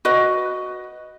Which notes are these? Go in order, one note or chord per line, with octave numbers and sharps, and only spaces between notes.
F#4 B4 D#5